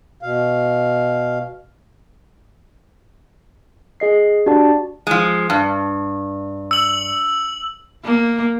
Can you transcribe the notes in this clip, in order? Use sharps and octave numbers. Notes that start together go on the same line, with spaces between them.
B2 F5
G#4 D#5 C7
D4 F#4 G4 D5 A5
F3 G#3
G2
E6 F#7
A#3